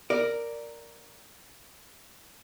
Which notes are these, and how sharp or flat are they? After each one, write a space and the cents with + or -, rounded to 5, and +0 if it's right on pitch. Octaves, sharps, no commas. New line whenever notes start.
A#4 +0 D5 +0